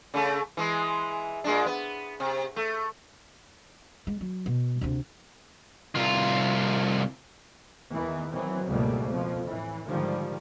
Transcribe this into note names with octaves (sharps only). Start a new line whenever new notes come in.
C#3 A3
E3 G#3
A#2 G#3 D4
B3
C3
A3
G#3
F#3
B2
D2 C3
C2 F4
E2 D#3 E3
D#3 E3 F#3 C4
C#2 G#2 B2 G3 A3 A#3
F2 B2 F3
A2 E3
G#2 D3 D#3 F3 G3